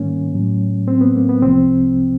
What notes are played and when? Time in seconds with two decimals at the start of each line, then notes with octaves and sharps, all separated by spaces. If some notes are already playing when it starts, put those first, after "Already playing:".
Already playing: G#2 D#3 G3 A#3 C#4
0.33 A2 F#3
0.88 C4
1.01 B3
1.16 A#3
1.29 B3
1.42 C2 C3 F3 C4